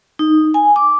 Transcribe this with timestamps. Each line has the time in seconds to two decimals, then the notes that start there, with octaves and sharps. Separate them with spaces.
0.19 D#4
0.54 G#5
0.76 D6